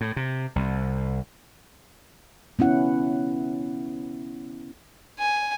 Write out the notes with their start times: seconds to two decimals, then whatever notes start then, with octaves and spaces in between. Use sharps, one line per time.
0.01 A2
0.16 C3
0.56 C2
2.59 B3 C#4 E4 F#5
5.19 G#5